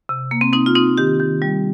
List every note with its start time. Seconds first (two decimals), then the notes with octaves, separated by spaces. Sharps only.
0.09 C3
0.31 A#3
0.41 C4
0.53 C4 D#4
0.66 F4
0.75 C4 D#4
0.98 D#3 G4
1.19 D#3
1.42 G3